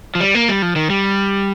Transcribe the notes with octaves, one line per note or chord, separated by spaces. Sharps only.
F3
G3
A#3
G3
F3
D#3
G3